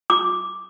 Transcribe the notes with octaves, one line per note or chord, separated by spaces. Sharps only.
D6